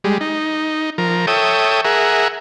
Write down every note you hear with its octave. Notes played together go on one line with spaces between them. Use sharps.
G3 G#3
D#4
F3 A#4
A4 C#5 E5 G5 D#6
G#4 A#4 E5 F#5